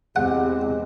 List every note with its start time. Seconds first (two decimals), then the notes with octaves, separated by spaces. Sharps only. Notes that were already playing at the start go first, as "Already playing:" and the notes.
0.16 E2 G#3 C4 G4 F#5